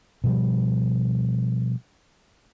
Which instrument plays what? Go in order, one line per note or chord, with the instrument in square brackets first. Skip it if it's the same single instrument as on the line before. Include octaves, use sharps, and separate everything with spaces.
[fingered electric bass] B2 F3 G3